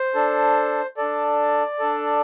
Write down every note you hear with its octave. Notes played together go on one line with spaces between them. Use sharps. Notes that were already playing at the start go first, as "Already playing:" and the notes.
Already playing: C5
D4 A4
D4 A4 D5
D4 A4